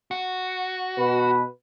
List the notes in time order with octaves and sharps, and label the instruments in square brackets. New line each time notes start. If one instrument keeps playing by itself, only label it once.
[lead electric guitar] F#4
[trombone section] B2 B4